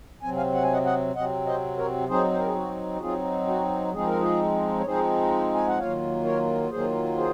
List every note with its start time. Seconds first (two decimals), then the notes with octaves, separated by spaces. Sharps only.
0.23 C3 F#3 C4 G#5
0.37 F5 G#5
0.53 F#5
0.63 G#5
0.73 D#5 F#5
0.85 D#5 F#5
1.15 C3 F#3 C4 D#5 F#5
1.46 C5 D#5
1.77 A#4 C#5
2.08 F#3 C4 D#4 G#4 C5
2.33 C5
2.39 A#4
2.46 G#4
2.55 F#4
2.96 F#4
3.00 F#3 C4 D#4 F4 G#4
3.47 F#4
3.93 F3 G#3 C4 D#4 G#4
4.07 A#4
4.20 F4 G#4
4.80 C#5
4.86 F3 G#3 C4 D#4 G#4 C5
5.54 G#5
5.67 F#5
5.78 D#3 F#3 A#3 F4 C#5 F5
6.24 A#4 C#5
6.71 D#3 F#3 A#3 F4 G#4 C5
7.17 G#4 C5